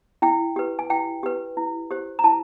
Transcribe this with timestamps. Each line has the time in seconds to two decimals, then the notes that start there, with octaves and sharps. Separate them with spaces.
0.22 E4 G5
0.56 G4 B4
0.79 G#5
0.90 E4 G5
1.23 G4 B4
1.57 E4
1.90 G4 C5
2.19 A#5
2.24 E4 A5